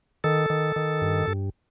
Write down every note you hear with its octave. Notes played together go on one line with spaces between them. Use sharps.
D#3 A4
D#3
D#3
G2
G2